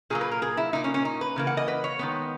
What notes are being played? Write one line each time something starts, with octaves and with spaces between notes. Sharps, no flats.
A#2 F#3 A#3 G#4
B4
A#4
G#4
E4
A#2 A#3 D#4
C#4
C#4
D#4
B4
C#3 E3 A#3
F#5
D#5
B4
C#5
D#3 G#3 B3